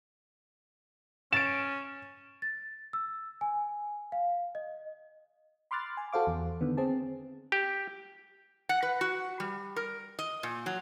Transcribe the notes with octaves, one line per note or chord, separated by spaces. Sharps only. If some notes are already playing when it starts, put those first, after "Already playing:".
C#4 A6 D7 E7
A6
E6
G#5
F5
D#5
B5 C6 D6 F6 F#6 A6
G#5
F#4 A4 C5 F5 D6
E2
D3 D#3 B3
C4 G#4 A5
G4
F#5
B4
F#4
G3
A#4
D#5
A#2
F#3